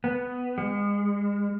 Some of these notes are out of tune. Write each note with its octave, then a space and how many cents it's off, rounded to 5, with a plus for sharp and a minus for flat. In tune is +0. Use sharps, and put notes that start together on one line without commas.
B3 +5
G#3 -35